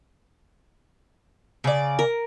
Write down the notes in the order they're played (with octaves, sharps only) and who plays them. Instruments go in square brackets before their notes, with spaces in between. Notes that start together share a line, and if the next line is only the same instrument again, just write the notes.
[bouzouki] C#3 D5
[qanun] A#4